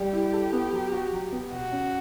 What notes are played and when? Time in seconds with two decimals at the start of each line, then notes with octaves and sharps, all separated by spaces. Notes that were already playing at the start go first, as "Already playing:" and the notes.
Already playing: G3 G4
0.12 E4
0.33 A4
0.53 B3
0.73 F#3
0.92 F#4
1.13 F#3
1.32 B3
1.52 B2 F#4
1.72 C#4